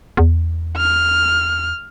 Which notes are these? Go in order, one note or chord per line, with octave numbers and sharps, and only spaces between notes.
E2
F6